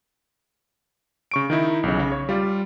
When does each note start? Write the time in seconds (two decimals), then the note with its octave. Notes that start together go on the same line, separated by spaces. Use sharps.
1.31 C#3 C#6 D7
1.50 D#3 D#4 E4
1.83 B1 C#3
1.99 C#3
2.12 C#5
2.29 G3 F4 D5